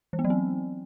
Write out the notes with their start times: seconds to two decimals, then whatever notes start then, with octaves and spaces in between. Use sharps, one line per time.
0.13 E3
0.19 B3
0.24 F#3
0.30 C4